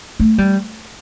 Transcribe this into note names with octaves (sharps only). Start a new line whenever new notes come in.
A3
G3